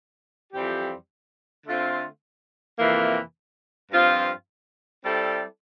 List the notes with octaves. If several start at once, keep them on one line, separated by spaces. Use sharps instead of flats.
F2 E3 G3 C4 G4
D3 A3 C4 F4
F2 C3 E3 A#3
G2 F3 C4 F4
G3 C4 E4 A4 D5